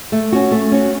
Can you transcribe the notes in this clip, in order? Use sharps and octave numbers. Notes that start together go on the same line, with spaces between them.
A3
C#4 F#4
A3
C#4 F#4